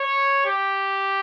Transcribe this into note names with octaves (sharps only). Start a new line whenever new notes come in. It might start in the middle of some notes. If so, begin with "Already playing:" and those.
Already playing: C#5
G4